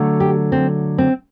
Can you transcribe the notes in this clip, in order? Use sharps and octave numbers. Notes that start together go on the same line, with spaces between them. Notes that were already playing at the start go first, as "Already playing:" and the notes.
Already playing: D3 F#3 A3
G4
C4
C4